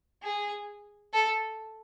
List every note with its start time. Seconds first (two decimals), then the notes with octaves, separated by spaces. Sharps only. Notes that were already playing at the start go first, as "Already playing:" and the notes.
0.23 G#4
1.14 A4